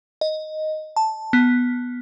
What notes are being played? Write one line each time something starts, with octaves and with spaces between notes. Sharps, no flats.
D#5
A5
B3